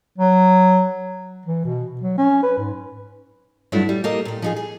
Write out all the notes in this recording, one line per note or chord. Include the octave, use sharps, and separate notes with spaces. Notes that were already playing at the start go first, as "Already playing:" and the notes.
F#3
E3
B2
F#3
C#4
B4
G#2
G2 F#3 A3 D4 E4 F4
G3
A#3 G4 A4 A#4 D#5
A#2 G4
F3 D#4 G#4
G#4